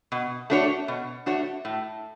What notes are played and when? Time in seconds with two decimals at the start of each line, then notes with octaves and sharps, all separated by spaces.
0.12 B2
0.50 A3 D4 F#4 C#5
0.88 B2
1.26 A3 D4 F#4 C#5
1.65 A2